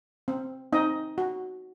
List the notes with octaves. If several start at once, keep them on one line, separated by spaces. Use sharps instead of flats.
C4
C4 D#4 D#5
F#4